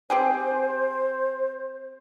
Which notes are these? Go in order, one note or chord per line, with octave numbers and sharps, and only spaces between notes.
C4 G4 G#4 C5